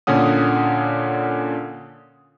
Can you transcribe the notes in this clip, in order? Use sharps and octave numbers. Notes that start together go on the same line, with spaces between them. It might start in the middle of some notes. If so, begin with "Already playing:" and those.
A#2 D3 C#4 F#5 D#6